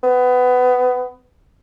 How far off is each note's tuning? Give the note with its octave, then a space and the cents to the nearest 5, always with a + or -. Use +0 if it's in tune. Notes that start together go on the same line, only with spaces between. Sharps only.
B3 +20